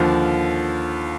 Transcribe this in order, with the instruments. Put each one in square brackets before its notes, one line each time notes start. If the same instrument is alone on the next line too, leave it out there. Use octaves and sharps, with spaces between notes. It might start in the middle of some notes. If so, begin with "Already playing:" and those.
Already playing: [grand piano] D#2 D3 F3 F6